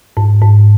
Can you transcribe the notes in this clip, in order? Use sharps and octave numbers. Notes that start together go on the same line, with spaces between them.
G#2
G#2